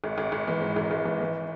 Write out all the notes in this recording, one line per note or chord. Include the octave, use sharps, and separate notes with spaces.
G#1
G#1
G#1
E3
G#2
G#1
G#1
E3
E3